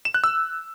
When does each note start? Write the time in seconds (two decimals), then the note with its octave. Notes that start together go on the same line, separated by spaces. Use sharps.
0.05 E7
0.14 F#6
0.24 E6